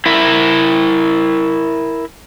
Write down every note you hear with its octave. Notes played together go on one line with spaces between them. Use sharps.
E4 A#4 E5